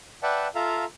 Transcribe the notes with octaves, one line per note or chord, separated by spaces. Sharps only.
B4 D5 E5 F#5 G5 A5
F4 A4 E5 F5 A#5